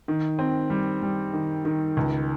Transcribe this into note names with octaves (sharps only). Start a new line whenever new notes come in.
D#3
C4
G3
G3
D#3
D#3
C#2